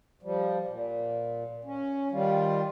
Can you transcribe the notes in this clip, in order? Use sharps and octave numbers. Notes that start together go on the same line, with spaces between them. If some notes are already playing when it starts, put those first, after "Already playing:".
F3 G3
A#2
C#4
D#3 G3 F4